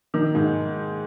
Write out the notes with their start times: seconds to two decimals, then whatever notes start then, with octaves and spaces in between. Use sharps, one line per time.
0.14 D#3
0.35 G#2